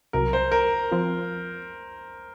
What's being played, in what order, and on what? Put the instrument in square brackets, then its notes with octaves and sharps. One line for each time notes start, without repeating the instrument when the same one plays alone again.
[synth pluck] C2 C3 F#3 [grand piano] A#4
[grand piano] C5
A#4
[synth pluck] F3 C4 F4